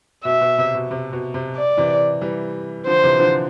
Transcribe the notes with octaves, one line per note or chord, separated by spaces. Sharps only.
B2 E5
B2
C3
B2
C3
B2
C3
D5
C3 E3
E3 G3
D3 F3 C5
C3 E3
D3 F3